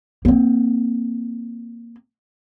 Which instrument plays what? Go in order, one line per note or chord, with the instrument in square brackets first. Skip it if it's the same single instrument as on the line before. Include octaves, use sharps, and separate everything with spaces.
[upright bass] A#3 C4